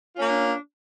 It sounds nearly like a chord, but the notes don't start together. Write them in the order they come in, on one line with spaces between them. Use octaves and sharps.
F4 C#4 A#3 D4